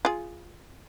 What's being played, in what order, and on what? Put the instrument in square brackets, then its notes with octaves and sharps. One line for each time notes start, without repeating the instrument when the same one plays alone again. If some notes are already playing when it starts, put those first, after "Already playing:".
[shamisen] F4 G#4